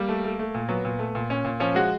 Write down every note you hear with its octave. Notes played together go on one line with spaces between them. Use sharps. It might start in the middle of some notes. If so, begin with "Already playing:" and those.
Already playing: G3 A#3
A3
A3
A3
A#2
F#3 B3
A#2
A3
A#2
A#2 C#4
A#2
F3 C#4
G#3 F#4